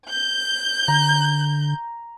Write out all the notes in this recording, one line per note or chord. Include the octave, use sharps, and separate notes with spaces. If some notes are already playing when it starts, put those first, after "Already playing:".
G6
D3 A#5